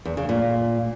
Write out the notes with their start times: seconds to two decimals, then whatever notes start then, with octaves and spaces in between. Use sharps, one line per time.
0.05 E2
0.17 C#3
0.29 A#2